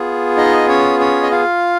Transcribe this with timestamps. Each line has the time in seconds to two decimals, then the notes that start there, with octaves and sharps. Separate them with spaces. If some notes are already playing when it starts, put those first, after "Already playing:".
Already playing: B3 F4 G#4
0.37 D#4 D#5
0.68 C#4 C#5
1.00 C#4 C#5
1.23 D#5
1.31 F4 F5